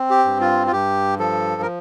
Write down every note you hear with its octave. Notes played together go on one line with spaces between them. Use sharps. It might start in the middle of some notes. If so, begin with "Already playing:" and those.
Already playing: C4
G4
G2
F4
F4
G2 G4
F3 A4
A#4